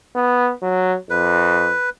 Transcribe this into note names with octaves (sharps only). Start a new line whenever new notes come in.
B3
F#3
F2 B4